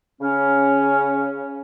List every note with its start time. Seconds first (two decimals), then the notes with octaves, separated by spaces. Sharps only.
0.21 C#3 C#4